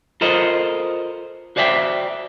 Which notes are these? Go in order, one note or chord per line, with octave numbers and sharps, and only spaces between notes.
F4 A4 A#4 C5 D#5
F#4 C5 D5 E5 F#5 G5